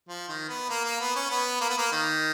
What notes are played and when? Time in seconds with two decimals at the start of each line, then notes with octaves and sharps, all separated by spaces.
0.08 F3
0.28 D#3
0.49 B3
0.69 A#3
0.85 A#3
1.01 B3
1.15 C#4
1.30 B3
1.61 A#3
1.69 B3
1.78 A#3
1.92 D#3